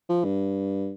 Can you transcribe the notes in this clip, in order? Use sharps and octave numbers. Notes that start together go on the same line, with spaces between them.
F3
G2